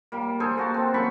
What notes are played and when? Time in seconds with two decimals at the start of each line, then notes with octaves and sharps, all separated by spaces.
0.12 G3 A#3
0.40 G#4 A4 C5 G#5
0.57 A#3 F#4 A5
0.74 C4 A4
0.94 F#2 A#3 B5 C#6